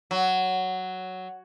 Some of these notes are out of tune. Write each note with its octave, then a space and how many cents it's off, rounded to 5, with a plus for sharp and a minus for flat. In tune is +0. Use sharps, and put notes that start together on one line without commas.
F#3 +5